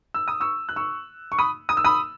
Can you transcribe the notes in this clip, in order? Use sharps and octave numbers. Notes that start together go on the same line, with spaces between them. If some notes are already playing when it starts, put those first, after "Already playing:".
E6
D#6
C#6 E6
F#6
C#6 E6
C#6
B5 D#6
D#6
E6
B5 D#6